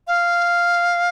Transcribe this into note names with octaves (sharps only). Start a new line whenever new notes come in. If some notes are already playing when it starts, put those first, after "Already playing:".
F5